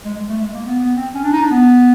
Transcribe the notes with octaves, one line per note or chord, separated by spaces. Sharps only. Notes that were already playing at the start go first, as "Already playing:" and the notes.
G#3
G#3
A3
G#3
A#3
B3
B3
C4
C#4
D4
D#4
D4
B3